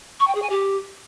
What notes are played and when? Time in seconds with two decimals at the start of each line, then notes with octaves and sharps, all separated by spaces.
0.20 C#6
0.27 G5
0.35 G#4
0.42 G#5
0.50 G4